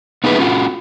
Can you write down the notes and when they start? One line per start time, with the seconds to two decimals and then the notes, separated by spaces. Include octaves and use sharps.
0.24 B3 D#4 E4 G#4 B4
0.39 C#4 F4 F#4